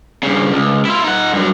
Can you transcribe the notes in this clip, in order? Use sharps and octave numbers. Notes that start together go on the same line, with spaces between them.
G2 C#3
C#2
E4 F4
D#4 F#5
G2 F#3